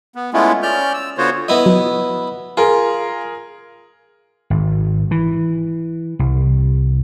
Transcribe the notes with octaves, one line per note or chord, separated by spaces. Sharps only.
B3
G#3 A3 B3 C#4 E4 F4
C#4 D5 F6 G6
E6
D3 B3 F4 F#4 C5 C#5
B3 E4 D#5
F#3
F4 G#4 A#4
G#1
E3
C2